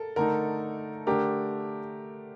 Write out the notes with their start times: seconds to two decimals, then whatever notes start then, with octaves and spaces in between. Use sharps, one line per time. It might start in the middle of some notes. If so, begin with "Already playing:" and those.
Already playing: A4 A#4
0.16 D3 A3 D#4 A#4
1.07 D3 A3 D4 G4 A#4